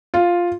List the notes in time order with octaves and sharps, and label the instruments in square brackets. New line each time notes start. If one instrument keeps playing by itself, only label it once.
[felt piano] F4